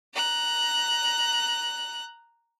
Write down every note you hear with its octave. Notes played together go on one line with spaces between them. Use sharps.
A#5 F#6